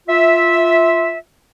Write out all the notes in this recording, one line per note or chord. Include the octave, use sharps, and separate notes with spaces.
F4 E5